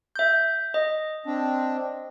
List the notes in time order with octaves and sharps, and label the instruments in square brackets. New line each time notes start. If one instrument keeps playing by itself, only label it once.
[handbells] E5 G6
D#5
[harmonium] C4 D4